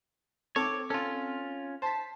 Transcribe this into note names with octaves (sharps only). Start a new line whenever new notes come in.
C4 A4 C#5 D6
C#4 F4 A4
C5 A5 B6